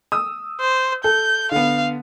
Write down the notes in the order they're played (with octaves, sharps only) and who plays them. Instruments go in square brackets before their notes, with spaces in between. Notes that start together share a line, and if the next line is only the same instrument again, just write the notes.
[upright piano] D#6 E6
[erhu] C5
[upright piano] A4 [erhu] G6
[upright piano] D3 B3 [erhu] F5